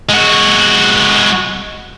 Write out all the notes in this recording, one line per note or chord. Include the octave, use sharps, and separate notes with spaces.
G#3 F#4